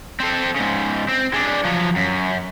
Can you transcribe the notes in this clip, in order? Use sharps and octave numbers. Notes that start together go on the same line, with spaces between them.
C4 A4
G#2 C#3
C4
G#3 D4
F3 F#3
F#2